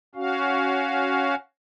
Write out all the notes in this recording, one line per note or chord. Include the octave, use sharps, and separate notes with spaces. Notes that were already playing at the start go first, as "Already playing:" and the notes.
C#4 F#4 F5